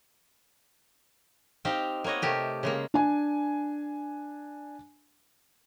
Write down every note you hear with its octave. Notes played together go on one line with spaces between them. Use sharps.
C4 D#4 G4 F5 G5
A#3 B3 C#5 D#5 F#5
C3 A3 G4 A#4
C#3 G#3 A#3
D4 G#5